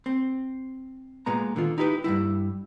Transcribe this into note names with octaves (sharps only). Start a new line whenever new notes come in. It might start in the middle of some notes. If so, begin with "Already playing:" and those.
C4
A#2 G#3 B3 A#5
D3 D#3 F4
D#4 E4 G4 G#4 B4
G2 F#3 G3 E4